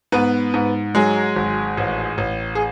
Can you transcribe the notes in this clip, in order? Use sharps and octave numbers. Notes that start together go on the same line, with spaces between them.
G#2 B3 B4
G#2
F#3 G#3 G#4
G#1
A1
A1
G#4